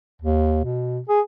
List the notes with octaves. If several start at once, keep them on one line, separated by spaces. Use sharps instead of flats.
D#2
B2
G#4